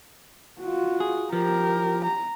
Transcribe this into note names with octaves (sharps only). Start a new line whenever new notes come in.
F4 F#4
G#4
F3 G4 A#4
A#5